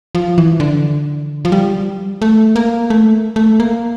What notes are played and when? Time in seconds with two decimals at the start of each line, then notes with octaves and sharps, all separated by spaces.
0.15 F3
0.38 E3
0.60 D3
1.45 F3
1.52 G3
2.22 A3
2.56 A#3
2.90 A3
3.36 A3
3.60 A#3